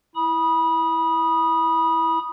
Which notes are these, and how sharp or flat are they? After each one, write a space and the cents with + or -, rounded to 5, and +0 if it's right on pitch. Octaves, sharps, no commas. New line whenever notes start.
E4 +0 B5 -25 D#6 -5